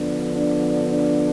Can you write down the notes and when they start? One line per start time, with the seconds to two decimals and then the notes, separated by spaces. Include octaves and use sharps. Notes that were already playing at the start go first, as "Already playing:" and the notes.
Already playing: D3 F3 B3 D4
0.36 D4
0.90 D4